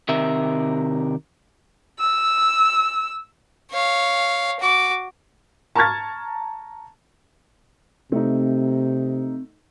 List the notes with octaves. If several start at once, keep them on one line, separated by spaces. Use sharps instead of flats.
C3 D#3 A#4 E5
E6
C#5 F5
F#4 D6
A5 A#5 C#6 F6 G#6 A6
C3 A3 C4 D#4